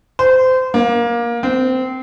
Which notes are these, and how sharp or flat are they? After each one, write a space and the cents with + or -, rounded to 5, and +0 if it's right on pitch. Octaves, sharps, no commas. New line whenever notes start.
C5 -25
A#3 +20
C4 -20